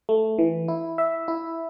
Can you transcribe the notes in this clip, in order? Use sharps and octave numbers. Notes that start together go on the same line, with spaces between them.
A3
E3
E4
E5
E4